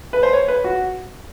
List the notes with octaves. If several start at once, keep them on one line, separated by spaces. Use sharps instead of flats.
B4
C5
C#5
B4
F#4